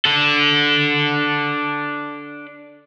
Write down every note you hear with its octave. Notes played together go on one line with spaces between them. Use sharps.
D4 A4